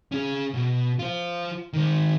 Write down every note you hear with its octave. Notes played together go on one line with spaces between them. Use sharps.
C#4 G#4
B2
F4 C5
D#3 C5